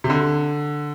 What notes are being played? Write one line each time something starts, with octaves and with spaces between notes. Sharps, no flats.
C3
D3